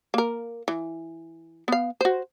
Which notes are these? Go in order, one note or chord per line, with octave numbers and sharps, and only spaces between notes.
A#3 A#4
E3
B3 F5
F#4 C5